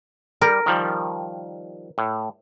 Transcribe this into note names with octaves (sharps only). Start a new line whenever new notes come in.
G3 A#4
D#3 F3 G3
A2